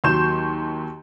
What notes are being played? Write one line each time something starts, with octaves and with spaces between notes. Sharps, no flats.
D#2 F#3 C6 C#6 G6 E7